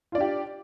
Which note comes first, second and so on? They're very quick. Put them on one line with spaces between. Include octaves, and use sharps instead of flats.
F4 D5 D4 G4